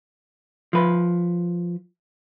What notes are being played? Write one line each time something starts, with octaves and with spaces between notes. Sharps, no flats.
F3 B4